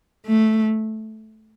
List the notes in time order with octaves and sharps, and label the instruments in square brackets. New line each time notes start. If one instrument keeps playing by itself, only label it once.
[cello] A3